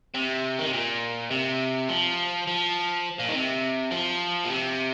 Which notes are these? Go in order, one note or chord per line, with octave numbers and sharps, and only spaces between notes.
C3
D#3
C3
A#2
C3
F3
F3
A#2
D#3
C3
F3
A#2
C3